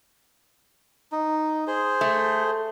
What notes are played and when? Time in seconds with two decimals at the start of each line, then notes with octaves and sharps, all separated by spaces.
1.12 D#4
1.67 G#4 C5
2.01 A3